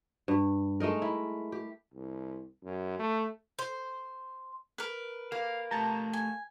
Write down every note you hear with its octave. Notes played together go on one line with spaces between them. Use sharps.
G2
G#3 A3 D#4 A#4
E4
G4
C2
F#2
A3
C5
A#4 B4
A#3 F5
A3 G4 A5 A#5
G#5